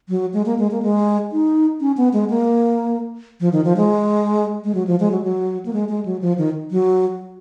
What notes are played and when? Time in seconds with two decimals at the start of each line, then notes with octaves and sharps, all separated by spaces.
0.09 F#3
0.34 G#3
0.46 A#3
0.59 G#3
0.71 A#3
0.82 G#3
1.32 D#4
1.81 C#4
1.97 B3
2.13 G#3
2.30 A#3
3.40 F3
3.53 D#3
3.65 F3
3.77 G#3
4.64 G#3
4.75 F#3
4.87 F3
5.00 G#3
5.11 F#3
5.24 F#3
5.66 A#3
5.73 G#3
5.89 G#3
6.06 F#3
6.21 F3
6.38 D#3
6.71 F#3